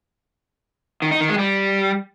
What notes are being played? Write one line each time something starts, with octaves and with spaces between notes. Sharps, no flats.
D#3
D#4
D#3
G#3
G3